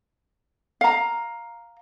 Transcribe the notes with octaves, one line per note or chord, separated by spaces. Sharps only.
F5 A#5